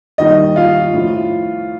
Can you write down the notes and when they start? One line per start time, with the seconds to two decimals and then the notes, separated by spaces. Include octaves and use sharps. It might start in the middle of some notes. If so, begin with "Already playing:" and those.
0.18 D#2 D#3 G3 D#5
0.56 F4 F5
0.94 A2 F3